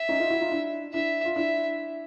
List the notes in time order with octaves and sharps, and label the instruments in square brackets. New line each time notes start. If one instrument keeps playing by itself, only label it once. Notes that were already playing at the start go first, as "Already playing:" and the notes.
Already playing: [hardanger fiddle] E5
[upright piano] C#4 D#4
D#4 F4
E4 F#4
D#4 F4
D4 E4
[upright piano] D4 E4 [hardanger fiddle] E5
[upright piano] F4
[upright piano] D4 E4 [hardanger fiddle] E5